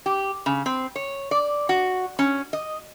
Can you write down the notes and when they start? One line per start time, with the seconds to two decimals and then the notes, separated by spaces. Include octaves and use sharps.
0.06 G4
0.46 C#3
0.66 C4
0.96 C#5
1.31 D5
1.69 F#4
2.19 C#4
2.53 D#5